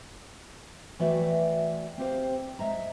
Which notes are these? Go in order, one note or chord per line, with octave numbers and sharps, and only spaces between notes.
E3 A3 F#4 D5 E5 G5
C4 G4 C5 F5
G#3 E5 A#5